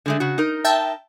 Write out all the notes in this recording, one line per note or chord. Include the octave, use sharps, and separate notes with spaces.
D3 G#3 A3
C#3 F#4
D#4 A#4
E5 G5 A5